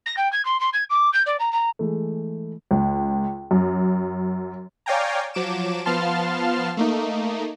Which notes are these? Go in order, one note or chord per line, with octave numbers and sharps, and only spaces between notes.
A#6
G5
G#6
C6
C6
G#6
D6
G6
D5
A#5
A#5
E3 G#3 A3
C#2
F#2
C#5 D5 F5 G5 G#5 A#5
F3 F#3 D6 D7 E7
F3 B3 F5 A5 C6 F6
A3 A#3 D#4